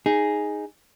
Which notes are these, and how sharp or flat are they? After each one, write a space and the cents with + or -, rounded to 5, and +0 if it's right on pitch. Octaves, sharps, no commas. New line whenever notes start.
D#4 +0 G#4 +0